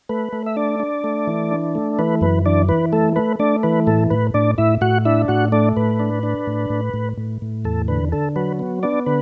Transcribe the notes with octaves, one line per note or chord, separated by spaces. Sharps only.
A3 B4
A3
E5
D4 D5
D4
A3
E3
D4
A3
E3 B4
F#2 B4
E3 D4 D5
E3 B4
A3 A4
A3 B4
A3 D4 D5
E3 B4
A2 A4
A2 B4
A2 D4 D5
A2 E4 E5
A2 F#4 F#5
D4 E4 E5
A2 F#4 F#5
A3 D4 D5
A2 B4
D4
D4
A2
A2
A2
A2
A2
E2 A4
D3 B4
D3 A4
F#3 B4
B3
B3 D4 D5
D3 B4